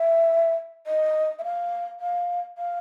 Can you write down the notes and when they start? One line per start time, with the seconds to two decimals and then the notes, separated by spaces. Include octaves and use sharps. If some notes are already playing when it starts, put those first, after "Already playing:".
Already playing: E5
0.87 D#5
1.39 E5
1.44 F5
2.00 F5
2.58 F5